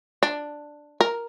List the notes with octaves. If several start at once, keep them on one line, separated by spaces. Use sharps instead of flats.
D4
A#4